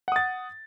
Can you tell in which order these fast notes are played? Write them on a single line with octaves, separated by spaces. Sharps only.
F#5 D#6 A6